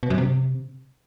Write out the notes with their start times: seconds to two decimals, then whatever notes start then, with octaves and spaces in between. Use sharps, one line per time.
0.03 B2
0.10 F#2
0.18 C3